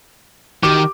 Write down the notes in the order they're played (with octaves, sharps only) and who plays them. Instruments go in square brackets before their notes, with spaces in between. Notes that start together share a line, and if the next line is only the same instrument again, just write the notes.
[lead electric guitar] D#3 [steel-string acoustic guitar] F#4 G4 A#4 [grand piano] D6